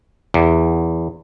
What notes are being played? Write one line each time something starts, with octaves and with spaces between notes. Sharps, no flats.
E2